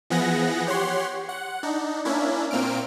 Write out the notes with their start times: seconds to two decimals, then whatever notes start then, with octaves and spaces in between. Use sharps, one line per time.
0.10 E3 F3 B3 G#4 F#5 A#6
0.67 G4 C#5 F#5 C6
1.29 F#5
1.63 D4 D#4
2.05 A#3 C#4 D4 E4
2.51 A#2 A#3 C4 F6 D7